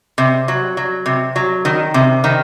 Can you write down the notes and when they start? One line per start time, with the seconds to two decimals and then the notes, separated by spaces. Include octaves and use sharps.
0.18 C3
0.48 F#3
0.77 F#3
1.06 C3
1.36 F#3
1.65 D#3
1.94 C3
2.24 D#3